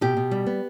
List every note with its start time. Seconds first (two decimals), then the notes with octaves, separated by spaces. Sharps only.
0.01 B2 G4
0.17 B2
0.31 G3
0.46 B3